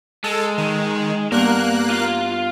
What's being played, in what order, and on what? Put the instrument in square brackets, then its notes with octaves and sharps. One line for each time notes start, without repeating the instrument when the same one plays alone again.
[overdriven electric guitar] G#3 [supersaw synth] A4
[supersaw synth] D#3
[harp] G2 B3 [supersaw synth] A#3 F#6 [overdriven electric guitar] A#4
[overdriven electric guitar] F4 F5